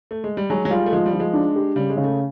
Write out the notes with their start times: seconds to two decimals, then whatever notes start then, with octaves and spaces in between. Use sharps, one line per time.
0.11 A3
0.24 G#3
0.37 G3
0.50 F#3 G#3
0.65 F#3
0.71 G3 F4
0.86 A3
0.92 F3 G#3
1.06 G3
1.13 F3
1.20 G#3
1.33 D4
1.56 G4
1.76 C#3 G3
1.90 G#3
1.97 C#3
2.04 A3